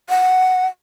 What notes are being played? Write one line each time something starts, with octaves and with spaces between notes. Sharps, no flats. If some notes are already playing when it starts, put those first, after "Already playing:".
F#5